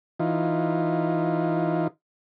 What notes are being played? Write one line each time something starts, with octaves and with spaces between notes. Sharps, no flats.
E3 D#4 F4